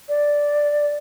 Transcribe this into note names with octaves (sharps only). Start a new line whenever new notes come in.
D5